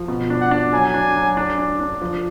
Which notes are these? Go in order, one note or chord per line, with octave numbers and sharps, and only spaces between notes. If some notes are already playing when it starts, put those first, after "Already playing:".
Already playing: F3
B2
D4
F#5
D4
F#3 G#5
D4
F#3
D4
D4
D4
F3